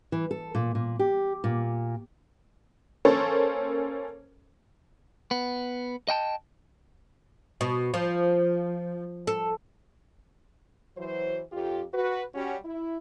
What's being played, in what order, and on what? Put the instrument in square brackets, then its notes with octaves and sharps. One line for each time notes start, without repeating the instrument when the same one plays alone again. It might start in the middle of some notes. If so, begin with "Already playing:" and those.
[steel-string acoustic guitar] E3
A4
A#2
A#2
G4
A#2
[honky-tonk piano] A#3 C#4 A4 C5 C#5
[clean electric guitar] B3
D#5 G5 A5
[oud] B2
F3
A4
[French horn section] E3 F#3 C5
F2 F4 G4
F#4 B4
G3 C#4 F#4
E4